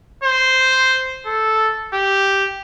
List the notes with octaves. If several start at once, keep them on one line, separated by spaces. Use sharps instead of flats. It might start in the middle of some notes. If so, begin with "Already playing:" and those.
C5
A4
G4